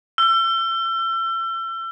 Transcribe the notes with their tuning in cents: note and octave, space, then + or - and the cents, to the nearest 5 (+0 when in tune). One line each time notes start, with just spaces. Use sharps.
E6 +35